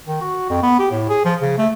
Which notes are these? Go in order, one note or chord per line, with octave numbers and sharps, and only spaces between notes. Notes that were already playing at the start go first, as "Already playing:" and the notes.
D#3
F#4
F2
B3
G4
A2
G#4
F3
C#3
A3